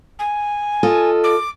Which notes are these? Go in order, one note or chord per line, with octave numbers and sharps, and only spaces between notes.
G#5
F4 A4 D#5
D6